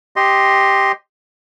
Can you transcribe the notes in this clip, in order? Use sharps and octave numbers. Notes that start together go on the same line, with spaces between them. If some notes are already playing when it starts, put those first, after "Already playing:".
G4 D#5 C6